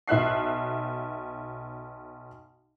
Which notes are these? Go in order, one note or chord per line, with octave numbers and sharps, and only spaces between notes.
B1 E5 F#6 C7